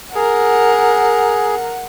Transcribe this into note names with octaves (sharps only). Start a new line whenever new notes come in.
G#4 A#4 F#5